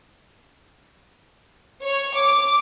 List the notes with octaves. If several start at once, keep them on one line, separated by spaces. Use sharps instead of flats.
C#5
D6